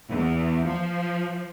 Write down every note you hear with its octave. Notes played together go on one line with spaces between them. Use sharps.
E2
F3